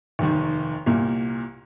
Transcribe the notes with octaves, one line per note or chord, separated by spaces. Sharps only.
F1 D#2 D#3
C2 A#2 A#3